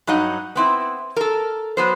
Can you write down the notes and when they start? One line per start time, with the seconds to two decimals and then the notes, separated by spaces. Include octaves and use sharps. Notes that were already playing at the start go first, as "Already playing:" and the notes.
0.07 G2 F#3 D#4 D#5 F#5
0.56 B3 C4 E4
1.16 A4 A#4
1.77 F#3 B3 C5